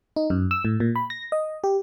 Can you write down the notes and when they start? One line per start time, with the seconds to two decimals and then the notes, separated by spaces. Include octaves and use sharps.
0.16 D#4
0.30 F#2
0.51 E6
0.65 A2
0.80 A#2
0.96 B5
1.10 A#6
1.32 D#5
1.64 G4